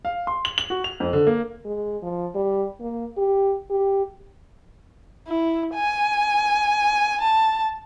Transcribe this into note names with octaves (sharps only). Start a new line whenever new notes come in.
F5
C6
F#7
F#7
F#4
F7
F2
D3
A#3
G#3
F3
G3
A#3
G4
G4
E4
G#5
A5